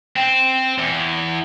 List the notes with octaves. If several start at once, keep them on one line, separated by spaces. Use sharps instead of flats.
C4
E2